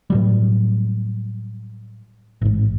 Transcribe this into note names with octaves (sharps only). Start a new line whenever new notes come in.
A2 F#3 G3
A1 G#2